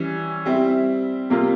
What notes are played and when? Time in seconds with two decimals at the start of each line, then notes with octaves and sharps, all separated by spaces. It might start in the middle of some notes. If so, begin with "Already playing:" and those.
Already playing: E3 G3 C#4
0.45 G3 C4 E4
1.30 C3 G3 A#3 F4